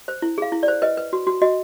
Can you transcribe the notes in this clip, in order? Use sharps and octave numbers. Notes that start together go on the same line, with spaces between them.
C5
E4
G#4 F5
E4
D5
C5
B4 D#5
B4
F#4
F#4
F#4 D#5